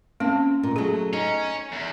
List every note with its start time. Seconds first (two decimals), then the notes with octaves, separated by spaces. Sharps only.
0.20 A#3 C4 C#4
0.63 A#2
0.76 F#3 A3 G#4 A5
1.13 C#4 D#4
1.73 E2